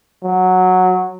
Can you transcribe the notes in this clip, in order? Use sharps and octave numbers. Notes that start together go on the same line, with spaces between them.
F#3